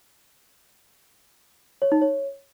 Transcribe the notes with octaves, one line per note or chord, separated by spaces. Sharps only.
C#5
D#4
C#5